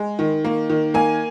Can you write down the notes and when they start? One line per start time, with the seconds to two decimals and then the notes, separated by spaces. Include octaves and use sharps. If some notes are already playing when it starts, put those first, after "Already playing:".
Already playing: G#3
0.19 D#3
0.45 A#3
0.70 D#3
0.94 A#3 G#5